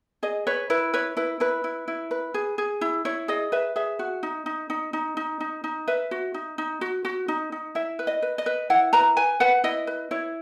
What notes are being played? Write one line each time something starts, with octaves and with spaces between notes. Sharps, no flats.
G#4 D#5
B4 C#5
E4 B4
B4 C#5
E4 B4
E4 B4
E4
E4
B4
G#4
G#4
E4
E4 C#5
G#4 D#5
B4 E5
G#4 E5
F#4
D#4
D#4
D#4
D#4
D#4
D#4
D#4
B4 E5
F#4
D#4
D#4
F#4
F#4
D#4
D#4
E4 E5
B4
D#5
B4
D#5
B4
E4 F#5
B4 A#5
B4 G#5
B4 F#5
E4 D#5
B4
E4 C#5